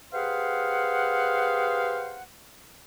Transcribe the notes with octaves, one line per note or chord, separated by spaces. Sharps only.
G4 G#4 B4 C5 F5 F#5